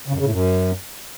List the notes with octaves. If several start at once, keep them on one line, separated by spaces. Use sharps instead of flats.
C#3
F#2
C#3
A2
F#2